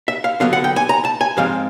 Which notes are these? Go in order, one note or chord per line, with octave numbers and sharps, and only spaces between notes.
E5
F5
D3 F#3 B3 F5
F#5
G5
G#5
A#5
A5
G#5
G#2 F3 G#3 C4 F5